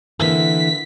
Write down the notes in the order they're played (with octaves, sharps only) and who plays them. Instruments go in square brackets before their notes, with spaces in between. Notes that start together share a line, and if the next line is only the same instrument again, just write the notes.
[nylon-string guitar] D3 E3 A#3 [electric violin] B6